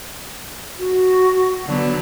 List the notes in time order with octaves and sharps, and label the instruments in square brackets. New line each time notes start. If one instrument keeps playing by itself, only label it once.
[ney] F#4
[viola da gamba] D3 F#3 B3